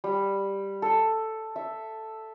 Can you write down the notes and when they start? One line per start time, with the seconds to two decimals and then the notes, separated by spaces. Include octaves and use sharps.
0.04 G3
0.82 A4
1.56 E5